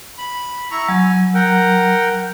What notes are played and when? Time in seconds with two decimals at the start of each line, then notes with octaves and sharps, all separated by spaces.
0.18 B5
0.71 E4 A#5 C#6
0.89 F#3 G#5
1.34 A#4 F#5 G5